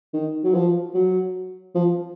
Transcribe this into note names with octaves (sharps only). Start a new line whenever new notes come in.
D#3
F#3
F3
F#3
F3